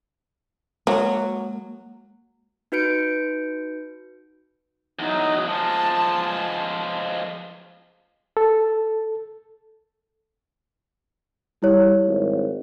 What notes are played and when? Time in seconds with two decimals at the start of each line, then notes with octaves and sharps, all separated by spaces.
0.87 F#3 G#3 A#3
2.72 D#4 F#4 B4 G6 C#7 D7
4.99 E2 F#3 D#4
5.48 F3 G#3 A5
8.37 A4
11.63 G3 E4 C#5
12.08 G#1